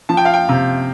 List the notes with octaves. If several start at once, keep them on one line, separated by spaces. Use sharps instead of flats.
F3 A5
G5
F5
G5
C3